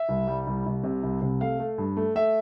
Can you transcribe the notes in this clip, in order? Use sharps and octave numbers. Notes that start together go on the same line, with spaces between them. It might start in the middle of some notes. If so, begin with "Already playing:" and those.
Already playing: E5
C2
G3
C2
C2
C3
C2
C3
A3 F5
A3
G2
A3
A3 E5